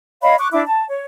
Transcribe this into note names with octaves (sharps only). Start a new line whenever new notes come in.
C#5 D#5 F5 B5
C#6 D6 F#6
D4 E4 D6
A5
C#5